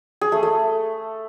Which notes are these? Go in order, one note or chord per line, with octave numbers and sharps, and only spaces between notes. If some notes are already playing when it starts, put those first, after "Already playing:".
G#4
A3
A3